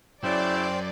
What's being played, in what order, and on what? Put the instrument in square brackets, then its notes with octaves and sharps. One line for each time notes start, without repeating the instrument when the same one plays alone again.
[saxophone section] C#3 E4 [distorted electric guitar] F#3 C#4 [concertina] C5 G5 [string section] D5